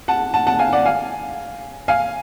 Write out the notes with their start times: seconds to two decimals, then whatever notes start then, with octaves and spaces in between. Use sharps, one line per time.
0.08 F#5 A5
0.34 F#5 A5
0.47 F#5 A5
0.59 F5 G#5
0.73 D5 F#5
0.86 F5 G#5
1.88 F5 G#5